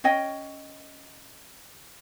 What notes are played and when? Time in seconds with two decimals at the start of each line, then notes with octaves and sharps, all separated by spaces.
0.04 C#4 C#5 D#5 G5